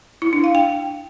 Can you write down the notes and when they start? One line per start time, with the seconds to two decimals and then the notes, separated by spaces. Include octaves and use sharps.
0.22 E4
0.33 D4
0.44 F5
0.55 G5